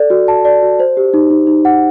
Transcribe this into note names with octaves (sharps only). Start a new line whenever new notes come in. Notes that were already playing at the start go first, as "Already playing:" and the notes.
Already playing: A4 D5
F#4
A5
D5
F#4
C5
G4
D#4
D#4
D#4
F#5